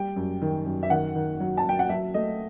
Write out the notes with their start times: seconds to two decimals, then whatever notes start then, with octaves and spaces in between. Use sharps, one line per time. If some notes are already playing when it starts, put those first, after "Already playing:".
Already playing: G3 G5
0.16 F#2
0.42 D#3
0.66 F#2
0.83 E5
0.90 D#3 F#5
1.15 D#3
1.40 F#3
1.58 A5
1.65 F#3 G5
1.79 F#5
1.89 F#3 E5
2.14 A3 D#5